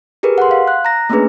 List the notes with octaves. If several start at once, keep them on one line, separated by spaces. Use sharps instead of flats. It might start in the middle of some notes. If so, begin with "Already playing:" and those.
G4 G#4 A#4 B4
F#5 C6
F5
F#6
A#5 A#6
A3 A#3 C#4 D4 G#4 B4